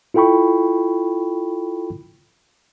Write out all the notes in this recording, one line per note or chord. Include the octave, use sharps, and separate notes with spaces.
E4 F4 A4 G5 B5 C#6